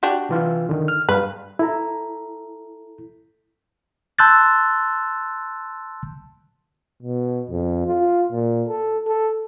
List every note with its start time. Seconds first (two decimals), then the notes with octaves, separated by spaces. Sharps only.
0.03 D4 F#4 G4
0.29 C3 E3 F4
0.69 D3 D#3
0.88 F6
1.09 G2 G3 B4 F5
1.59 E4 A4 A#5
4.19 A5 C6 E6 F#6 G6 A6
7.03 B2
7.50 F2
7.87 F4
8.31 A#2
8.68 A4
9.07 A4